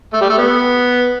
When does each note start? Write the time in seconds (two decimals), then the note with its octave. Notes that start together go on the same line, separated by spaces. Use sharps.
0.13 A3
0.21 G3
0.30 A3
0.38 B3